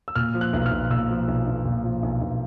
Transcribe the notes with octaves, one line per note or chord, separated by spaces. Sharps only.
E6
A#2 F6
F3
F#6
B1
F6
B1
A#2 E6
F3
B1
B1
A#2
F3
B1
B1